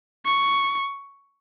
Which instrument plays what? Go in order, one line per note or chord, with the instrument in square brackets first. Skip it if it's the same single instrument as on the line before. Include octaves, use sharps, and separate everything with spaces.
[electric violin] C#6